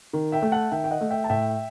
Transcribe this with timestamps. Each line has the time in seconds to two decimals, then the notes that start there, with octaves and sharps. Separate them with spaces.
0.13 D#3
0.32 E5 G5
0.42 A3
0.52 F#5 A5
0.72 D#3 E5 G5
0.84 G5
0.91 D#5 F#5
1.01 A3
1.11 E5 G5
1.24 A5
1.30 A2 E5 G5